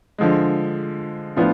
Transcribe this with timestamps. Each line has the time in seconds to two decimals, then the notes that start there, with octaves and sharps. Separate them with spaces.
0.18 D3 F3 G#3
1.36 A2 F3 B3 D4 F4